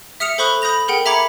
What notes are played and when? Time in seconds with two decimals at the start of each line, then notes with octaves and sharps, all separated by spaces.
0.20 E5 D#6 F6 C#7 F7
0.38 A4 C5 B5 C#6 D#6 F#6
0.62 B5 D#6 G6 A#6 F7
0.88 G#4 A#4 F#5 G5
1.06 E5 A#5 B5 D6 G#6 C#7